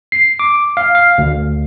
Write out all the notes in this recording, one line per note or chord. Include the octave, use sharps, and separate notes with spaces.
C7
D6
F5
F5
D2